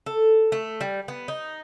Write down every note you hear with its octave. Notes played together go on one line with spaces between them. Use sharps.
A4
A3
G3
B3
D#4